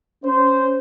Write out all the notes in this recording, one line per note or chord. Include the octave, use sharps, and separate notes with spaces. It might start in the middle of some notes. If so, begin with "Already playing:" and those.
C#4 C5